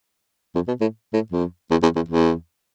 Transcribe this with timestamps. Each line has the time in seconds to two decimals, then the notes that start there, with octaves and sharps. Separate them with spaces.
0.55 F2
0.68 B2
0.81 A2
1.13 A2
1.32 F2
1.71 E2
1.83 E2
1.96 E2
2.08 E2